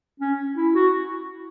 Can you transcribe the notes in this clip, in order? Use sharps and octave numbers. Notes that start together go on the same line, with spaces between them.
C#4
E4
F#4